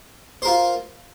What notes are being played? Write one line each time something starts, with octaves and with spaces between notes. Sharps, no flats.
F4 A#4 C5